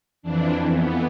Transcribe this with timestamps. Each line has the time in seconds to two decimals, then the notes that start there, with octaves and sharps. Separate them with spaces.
0.23 F2 E3 D4
0.72 B3